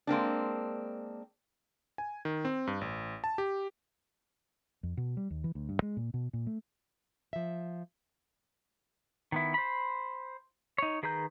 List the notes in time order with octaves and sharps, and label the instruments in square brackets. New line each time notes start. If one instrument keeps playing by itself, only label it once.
[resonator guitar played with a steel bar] G#3 A#3 C4 D4
[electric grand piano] G#5
D#3
C4
G2
A1
A5
G4
[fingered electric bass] F2
B2
G3
D#2
E3
D2
G2
G#3
A#2
B2
A#2
A3
[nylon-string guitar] F3 E5
[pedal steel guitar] D#3 B3 E4
C5 B5
D#4 C#5
D#3 G#4 B4 A#5 G6